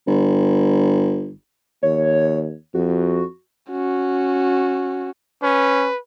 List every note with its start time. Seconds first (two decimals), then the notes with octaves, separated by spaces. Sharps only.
0.07 G1
1.83 D#2 C#5
2.74 F2 F#4
3.70 C#4 F#4
5.43 C#4 B4